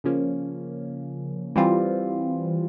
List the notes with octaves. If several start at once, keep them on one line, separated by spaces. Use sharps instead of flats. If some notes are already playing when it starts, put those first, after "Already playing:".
C#3 F3 A#3 C#4
E3 G3 C4 F4